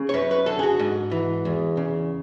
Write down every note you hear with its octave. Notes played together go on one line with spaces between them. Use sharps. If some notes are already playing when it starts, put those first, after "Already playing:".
Already playing: C#3
C#5
F#2 B4
B4
D3 A4
G#4
F#4
G#2
E3
E2
C#3